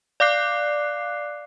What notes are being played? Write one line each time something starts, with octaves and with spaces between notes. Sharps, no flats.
D5 F5 D6 F#6 C7